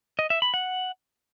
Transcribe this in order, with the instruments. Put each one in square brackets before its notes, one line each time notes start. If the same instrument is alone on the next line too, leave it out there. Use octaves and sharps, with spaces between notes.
[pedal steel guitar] D#5
E5
B5
F#5